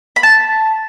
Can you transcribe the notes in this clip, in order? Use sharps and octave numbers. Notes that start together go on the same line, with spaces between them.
B5
A5